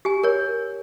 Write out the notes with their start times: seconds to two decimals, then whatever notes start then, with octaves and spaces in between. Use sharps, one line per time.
0.05 G4 G#5
0.23 A#4 C#5